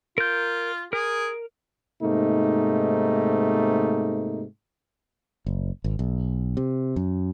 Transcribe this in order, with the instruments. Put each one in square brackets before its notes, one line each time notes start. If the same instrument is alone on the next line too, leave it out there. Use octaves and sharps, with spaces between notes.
[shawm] F4 [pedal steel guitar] A#4 G6
[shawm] G#4 [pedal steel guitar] A#4
[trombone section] G#2 C3 A3 A#3 D#4
[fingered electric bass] F#1
G#1
B1
C3
F#2